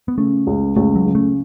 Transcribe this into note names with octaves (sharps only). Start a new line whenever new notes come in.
B3
C#3 A3
C#2
C#2 A3
F#3
C#3
A3